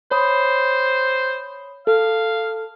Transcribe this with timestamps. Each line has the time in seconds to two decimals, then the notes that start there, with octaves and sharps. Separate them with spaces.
0.11 C5 C#5 B5 D#6
1.87 A4 F5